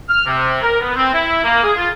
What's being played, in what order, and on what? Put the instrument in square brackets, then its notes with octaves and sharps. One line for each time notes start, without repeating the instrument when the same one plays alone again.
[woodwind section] F6
C3
A#4
B3
C4
E4
A#3
G#4
F4